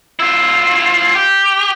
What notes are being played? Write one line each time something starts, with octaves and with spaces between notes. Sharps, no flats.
E4 F4
G4